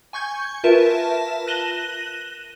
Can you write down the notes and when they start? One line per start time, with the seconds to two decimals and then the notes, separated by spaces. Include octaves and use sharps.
0.13 G#5 C#6 G6 G#6
0.64 F4 A#4 B4 E5 A5 E7
1.47 F#6 A#6 D#7 E7 F#7 G7